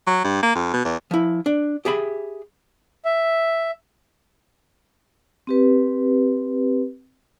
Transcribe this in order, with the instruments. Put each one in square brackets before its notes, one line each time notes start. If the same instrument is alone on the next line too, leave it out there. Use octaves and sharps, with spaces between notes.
[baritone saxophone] F#3
G2
A#3
F2
B2
E2
[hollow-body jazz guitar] F3 E4
D4
G4 G#4 E5 B5
[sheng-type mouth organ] E5
[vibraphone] C4 G4 B4